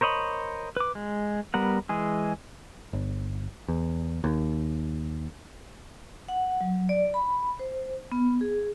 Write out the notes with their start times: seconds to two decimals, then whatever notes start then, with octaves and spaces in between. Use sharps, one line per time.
0.01 A#4 C5 C#5 D#5 B5
0.77 B4 D6
0.95 G#3
1.54 G3 B3 A#4 F#5
1.89 E3 G#3 G#4
2.93 G1
3.68 E2
4.24 D#2
6.28 F#5
6.61 F#3
6.89 D5
7.14 B5
7.59 C5
8.12 B3
8.41 G#4